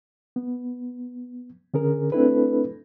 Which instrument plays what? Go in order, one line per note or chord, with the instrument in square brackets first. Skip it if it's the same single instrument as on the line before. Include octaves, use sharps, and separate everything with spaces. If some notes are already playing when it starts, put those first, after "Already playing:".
[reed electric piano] B3
D3 C#4 G#4 A#4
A3 C4 D4 E4 A4 B4